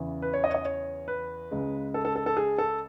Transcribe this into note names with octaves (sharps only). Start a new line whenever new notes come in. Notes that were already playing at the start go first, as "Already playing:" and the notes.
Already playing: E2 C#3 E3
B4
C#5
D#5
C#5
D#5
C#5
B4
C#2 C#3 G#3
A4
A4
A4
A4
G#4
A4